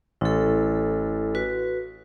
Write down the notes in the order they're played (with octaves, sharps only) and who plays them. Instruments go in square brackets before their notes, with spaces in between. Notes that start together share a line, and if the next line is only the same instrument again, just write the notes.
[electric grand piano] A1 [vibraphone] E4 A4
[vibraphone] F#4 B4